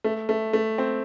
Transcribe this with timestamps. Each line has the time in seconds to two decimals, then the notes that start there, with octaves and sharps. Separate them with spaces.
0.04 A3
0.29 A3
0.53 A3
0.78 C4